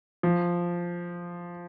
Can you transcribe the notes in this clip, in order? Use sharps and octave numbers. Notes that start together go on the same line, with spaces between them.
F3